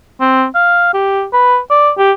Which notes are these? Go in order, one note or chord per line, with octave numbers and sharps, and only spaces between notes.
C4
F5
G4
B4
D5
G4